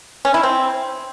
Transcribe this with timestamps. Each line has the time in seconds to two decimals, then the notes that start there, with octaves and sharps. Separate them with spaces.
0.25 C#4
0.34 E4
0.43 C4